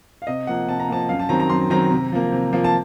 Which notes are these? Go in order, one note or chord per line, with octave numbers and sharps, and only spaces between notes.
F5
C3 D#5
F3 A#3 F#5
C3 A5
A#5
F3 A#3 A5
F#2 F5
A5
D#3 F#3 C4 A#5
A#5
F#2 C6
D#3 F#3 C4 A#5
C3
F3 A#3
C3
F3 A#3
A5